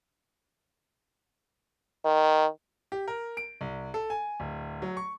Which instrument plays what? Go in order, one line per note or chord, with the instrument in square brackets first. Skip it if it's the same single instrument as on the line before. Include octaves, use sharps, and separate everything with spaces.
[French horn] D#3
[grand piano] G4
A#4
D7
C2
A4
G#5
D1
F#3
C#6